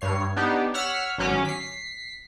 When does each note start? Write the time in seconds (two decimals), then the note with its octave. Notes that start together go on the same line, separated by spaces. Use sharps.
0.01 G2 C#5 C7
0.36 B3 D4 D#4 G4
0.74 C#5 F#5 E6 F6 B6
1.18 G#1 F#3 C#4 D6
1.45 B6 C7